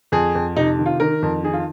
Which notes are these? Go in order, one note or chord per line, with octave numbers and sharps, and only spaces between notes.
F2 G#4
F2
C3 D#4
D#3
F4
D#3 A#4
F2
D#3 G#4
F4